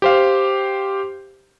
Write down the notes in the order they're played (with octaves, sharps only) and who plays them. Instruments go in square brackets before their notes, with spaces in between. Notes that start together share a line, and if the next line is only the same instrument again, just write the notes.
[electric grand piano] G4 C5 F5